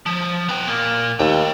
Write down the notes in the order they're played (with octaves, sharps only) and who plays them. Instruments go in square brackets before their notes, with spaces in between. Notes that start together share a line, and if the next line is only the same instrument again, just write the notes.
[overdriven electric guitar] F3
B3 G5
A#2 A#3
[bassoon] D#2 [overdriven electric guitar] A3 G5